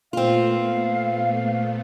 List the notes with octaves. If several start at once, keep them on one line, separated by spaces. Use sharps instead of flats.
A#2 A3 B3 C4 F4 F5